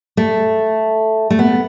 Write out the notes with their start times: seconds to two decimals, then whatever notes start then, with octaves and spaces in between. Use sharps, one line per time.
0.17 A3
1.30 A3
1.39 B3